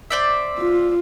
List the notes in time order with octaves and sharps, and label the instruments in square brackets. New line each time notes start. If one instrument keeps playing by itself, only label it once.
[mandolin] C5 D5 E5
[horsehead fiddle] F4